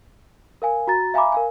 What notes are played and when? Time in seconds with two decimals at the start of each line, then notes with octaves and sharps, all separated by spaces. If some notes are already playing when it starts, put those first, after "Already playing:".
0.62 A#4 F5 G#5
0.87 F#4 A#5 A6
1.14 E5 F5 G#5 A#5 B5 D6
1.32 A#4 F5 G#5